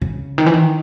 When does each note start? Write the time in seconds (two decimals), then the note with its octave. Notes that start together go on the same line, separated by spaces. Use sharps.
0.02 C#3
0.38 D#3
0.46 E3
0.54 D#3